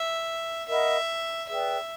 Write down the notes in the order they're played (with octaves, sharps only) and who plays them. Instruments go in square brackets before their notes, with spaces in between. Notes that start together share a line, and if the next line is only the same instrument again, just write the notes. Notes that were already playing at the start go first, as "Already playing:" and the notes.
Already playing: [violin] E5
[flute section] A#4 D#5 F#5 B5 [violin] E5
[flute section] G#4 B4 D5 G5 [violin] E5